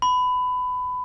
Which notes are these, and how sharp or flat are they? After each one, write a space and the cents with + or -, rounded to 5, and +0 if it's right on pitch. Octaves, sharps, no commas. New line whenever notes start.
B5 +20